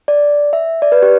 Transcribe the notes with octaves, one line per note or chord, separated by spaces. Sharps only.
D5
E5
D5
B4
G4